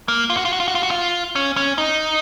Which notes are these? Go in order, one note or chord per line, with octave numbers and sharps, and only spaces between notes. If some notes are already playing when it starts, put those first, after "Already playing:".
A#3
F4
F#4
F4
F#4
F4
F#4
F4
F#4
F4
C#4
C#4
D#4